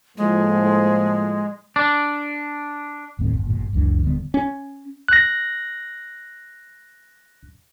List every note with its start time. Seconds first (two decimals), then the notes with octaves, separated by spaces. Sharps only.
0.17 A2 F3 G#3 A#3
1.76 D4
3.19 F1 D#2 A2 C4
3.33 G1
3.47 G1 A#2
3.73 F#1 C#2 E3 D4
4.03 D#1 D3 G3 B3
4.34 C#4
5.08 F#6 A#6